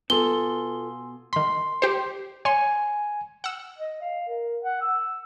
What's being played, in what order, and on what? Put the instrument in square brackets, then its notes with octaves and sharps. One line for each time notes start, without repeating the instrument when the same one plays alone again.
[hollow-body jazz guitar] B2 B3 [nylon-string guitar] F4 A4 [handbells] G#5 C6 E6 [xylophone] G7
[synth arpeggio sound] D#3 B5 [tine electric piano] C6
[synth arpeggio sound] G4 C5
[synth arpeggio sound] C#5 C6 [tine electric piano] G#5
[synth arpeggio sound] F#5 E6
[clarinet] D#5
F5
A#4
F#5
E6